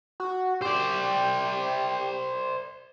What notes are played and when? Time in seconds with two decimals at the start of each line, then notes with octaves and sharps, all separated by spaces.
0.20 F#4
0.61 G4 C5 D5